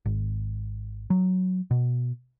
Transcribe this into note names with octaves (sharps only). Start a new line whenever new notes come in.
G#1
F#3
B2